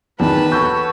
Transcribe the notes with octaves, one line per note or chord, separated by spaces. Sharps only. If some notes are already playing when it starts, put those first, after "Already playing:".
E2 D#3 B4 A5 B5
F#4 A4 C#5 G6